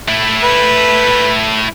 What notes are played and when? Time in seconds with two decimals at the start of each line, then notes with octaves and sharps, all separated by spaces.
0.08 A3 E4
0.43 B4